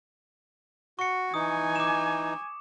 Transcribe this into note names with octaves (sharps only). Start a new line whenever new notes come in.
F#4 C#6 C#7
E3 D#4 G#5 D#6
D6 E7